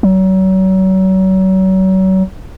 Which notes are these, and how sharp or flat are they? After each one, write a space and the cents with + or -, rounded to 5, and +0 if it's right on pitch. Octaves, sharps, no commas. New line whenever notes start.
F#3 +35